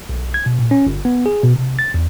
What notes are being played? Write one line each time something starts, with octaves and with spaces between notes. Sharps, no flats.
B1
G#6
B2
A#2
C#4
G1
B3
G#4
B2
C3
A6
E2